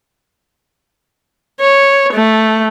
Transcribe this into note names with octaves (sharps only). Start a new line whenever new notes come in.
C#5
A3